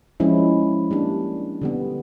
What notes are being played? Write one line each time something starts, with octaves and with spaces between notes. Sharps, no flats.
F3 G#3 C#4 E4
G3 A#3 D4
D3 G3 B3